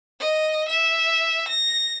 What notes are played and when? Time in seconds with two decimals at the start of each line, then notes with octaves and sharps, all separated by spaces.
0.20 D#5
0.68 E5
1.48 A#6